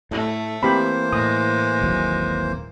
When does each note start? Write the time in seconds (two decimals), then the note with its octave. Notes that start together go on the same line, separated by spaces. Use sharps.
0.11 A2 A3
0.63 E3 A#3 C4 G4 C5 B5
1.13 A2 G#3 D#6
1.81 D#1 G#1 F#3